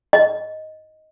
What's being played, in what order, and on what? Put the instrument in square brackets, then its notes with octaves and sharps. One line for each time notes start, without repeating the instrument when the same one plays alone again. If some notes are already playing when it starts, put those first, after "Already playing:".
[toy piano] D#5